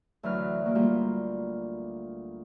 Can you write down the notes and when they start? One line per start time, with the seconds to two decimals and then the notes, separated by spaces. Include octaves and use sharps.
0.23 D2 E3 F#3 B4 F6
0.63 F#3 A#3
0.75 G3 A#3 F4